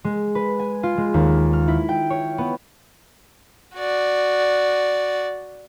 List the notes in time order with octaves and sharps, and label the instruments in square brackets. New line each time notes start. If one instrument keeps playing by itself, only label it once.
[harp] G#3
B4
G#5
F4
G#3
D#2
F6
E4
G5
C#5
B3
[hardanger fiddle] F#4 D5